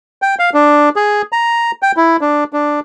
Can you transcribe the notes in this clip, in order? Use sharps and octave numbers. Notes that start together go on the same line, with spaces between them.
G5
F5
D4
G#4
A#5
G5
E4
D4
D4